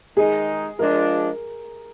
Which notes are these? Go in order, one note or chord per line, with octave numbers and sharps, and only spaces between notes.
D#3 G#3 D#4 G#4
F3 G#3 D4 F4 A#4